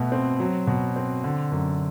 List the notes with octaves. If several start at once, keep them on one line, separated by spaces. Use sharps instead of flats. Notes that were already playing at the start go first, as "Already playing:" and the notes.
Already playing: B2 A3 B3
C4
F#3
B2
C4
D3
F#2